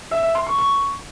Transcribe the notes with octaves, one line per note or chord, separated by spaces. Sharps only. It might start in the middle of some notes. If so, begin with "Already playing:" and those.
E5
E5
C6
C#6
C#6